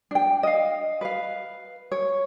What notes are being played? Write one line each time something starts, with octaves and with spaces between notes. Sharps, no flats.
D4 G5
D#5 F5
B4 F5
C#5